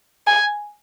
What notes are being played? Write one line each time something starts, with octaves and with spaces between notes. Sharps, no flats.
G#5